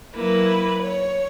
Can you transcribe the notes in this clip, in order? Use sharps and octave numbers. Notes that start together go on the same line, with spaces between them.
F#3 A#3 E4 B4
C#5